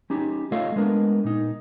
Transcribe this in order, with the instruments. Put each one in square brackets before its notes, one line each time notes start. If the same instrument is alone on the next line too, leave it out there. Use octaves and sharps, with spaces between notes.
[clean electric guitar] C#4 D#4 G4
A3 F4 A4 C#5 D#5 F5
G#3 B3 D4 A#4
A#2 D#4